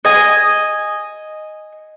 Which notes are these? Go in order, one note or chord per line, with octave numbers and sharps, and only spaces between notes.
D#5 G#5